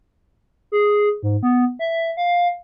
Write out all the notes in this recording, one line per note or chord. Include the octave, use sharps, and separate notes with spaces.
G#4
G#2
B3
E5
F5